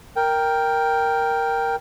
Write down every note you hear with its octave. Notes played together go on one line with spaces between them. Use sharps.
A#4 G5